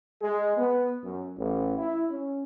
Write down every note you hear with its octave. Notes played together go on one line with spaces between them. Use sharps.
G#3
B3
F#2
A1
E4
C#4